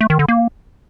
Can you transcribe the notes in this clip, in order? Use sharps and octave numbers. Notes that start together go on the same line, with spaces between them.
A3
D#3
D3
A#3